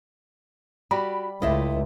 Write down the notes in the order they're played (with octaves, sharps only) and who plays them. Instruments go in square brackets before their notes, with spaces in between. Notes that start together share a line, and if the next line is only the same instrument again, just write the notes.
[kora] G3 [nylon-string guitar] F#4 G4 [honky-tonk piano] B5
[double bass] C#2 [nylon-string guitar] A3 E4 D#5 [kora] F4 G4